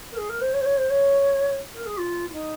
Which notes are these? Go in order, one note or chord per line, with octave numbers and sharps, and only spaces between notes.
A#4
G#4
A#4
C5
C#5
C5
C#5
C5
C#5
A#4
G#4
F4
F4
D#4